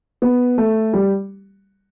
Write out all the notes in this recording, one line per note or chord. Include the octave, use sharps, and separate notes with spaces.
B3
A3
G3